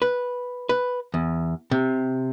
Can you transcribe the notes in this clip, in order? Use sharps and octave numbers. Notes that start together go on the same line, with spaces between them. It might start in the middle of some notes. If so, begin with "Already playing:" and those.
B4
B4
E2
C3